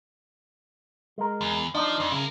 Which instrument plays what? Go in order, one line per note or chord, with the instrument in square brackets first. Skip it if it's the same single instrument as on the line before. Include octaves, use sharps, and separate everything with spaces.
[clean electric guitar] G#3 A#4
[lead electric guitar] E2
[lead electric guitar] F3 [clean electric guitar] D4 D#4
[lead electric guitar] F2
[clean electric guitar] C#3 [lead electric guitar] E4 A#4